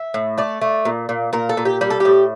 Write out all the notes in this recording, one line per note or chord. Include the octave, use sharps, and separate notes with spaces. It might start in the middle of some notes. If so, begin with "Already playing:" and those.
Already playing: E5
A2
A3 D5
A3
A#2
A#2
A#2 A#4
A4
A#2
G4
G3 G4
A4
A2 G4